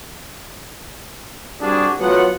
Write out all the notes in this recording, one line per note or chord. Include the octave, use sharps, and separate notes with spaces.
C2 G3 D4 F#4 G#4
F#3 A3 B3 F4 F#5